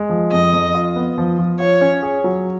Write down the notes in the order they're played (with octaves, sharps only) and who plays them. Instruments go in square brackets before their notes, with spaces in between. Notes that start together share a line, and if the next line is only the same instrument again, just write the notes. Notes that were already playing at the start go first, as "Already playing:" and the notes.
Already playing: [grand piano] G#3
F3
[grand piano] F2 [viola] D#5
[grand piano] F2
F4
B3
F3
F3
[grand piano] F4 [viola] C#5
[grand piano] C#4
G#4
F#3